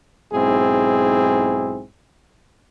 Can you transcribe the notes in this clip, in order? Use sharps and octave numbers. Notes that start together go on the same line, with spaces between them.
B1 G#2 C4 E4 G#4